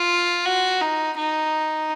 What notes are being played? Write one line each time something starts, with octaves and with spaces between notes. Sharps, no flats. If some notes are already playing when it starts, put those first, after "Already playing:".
Already playing: F4
F#4
D#4
D#4